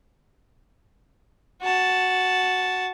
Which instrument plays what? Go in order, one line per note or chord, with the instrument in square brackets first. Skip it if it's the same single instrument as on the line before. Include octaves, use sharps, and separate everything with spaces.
[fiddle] F#4 A5